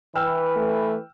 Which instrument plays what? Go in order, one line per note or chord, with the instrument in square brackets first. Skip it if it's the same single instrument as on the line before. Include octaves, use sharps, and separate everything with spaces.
[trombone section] E3 B4 [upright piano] G5 E6 F6
[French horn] A3